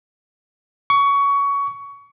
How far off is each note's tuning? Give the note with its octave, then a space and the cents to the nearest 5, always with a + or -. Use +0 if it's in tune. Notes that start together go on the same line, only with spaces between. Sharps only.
C#6 +20